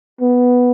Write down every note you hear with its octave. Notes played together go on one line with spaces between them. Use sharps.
B3